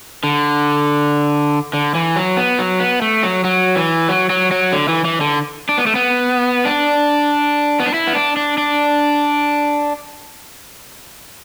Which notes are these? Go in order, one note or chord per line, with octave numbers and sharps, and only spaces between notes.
D3
D3
E3
F#3
B3
F#3
B3
A3
F#3
F#3
E3
F#3
F#3
F#3
D3
E3
E3
D3
D4
B3
A3
B3
D4
B3
D4
E4
B3
D4
D4
D4